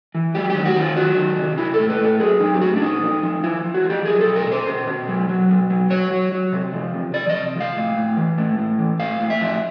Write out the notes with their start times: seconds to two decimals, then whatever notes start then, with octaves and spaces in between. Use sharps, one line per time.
0.15 E3
0.34 F#3 G4
0.50 G4
0.55 D#3
0.66 F#4
0.76 D#3
0.81 F4
0.96 F#3 F#4
1.17 D#3
1.38 C3
1.58 F#3 E4
1.74 A2 A4
1.90 B4
2.00 A2 A4
2.20 F#3 G#4
2.40 F#3 D#4
2.54 G4
2.61 A2 F#4
2.76 D4
2.82 A#2 D#4
3.02 F3
3.23 F3
3.43 F3 E4
3.64 F3
3.74 F#4
3.85 F3
3.90 G4
4.05 F#3 G#4
4.21 A4
4.26 B2
4.36 A#4
4.47 B2 C5
4.67 B2
4.87 B2
5.08 F#3
5.29 F#3
5.49 B2
5.70 F#3
5.90 F#3 C#5
6.11 F#3
6.32 F#3
6.53 C3
6.73 F3
6.93 C3
7.14 F3 D5
7.29 D#5
7.34 C3
7.55 F3
7.60 F5
7.76 A2
7.96 A2
8.17 E3
8.38 A2
8.59 A2
8.79 E3
8.99 A2 F5
9.20 A2
9.30 E5
9.41 F3